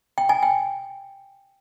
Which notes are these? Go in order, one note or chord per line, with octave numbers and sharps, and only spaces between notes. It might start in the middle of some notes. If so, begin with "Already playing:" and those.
G5
G#5
G5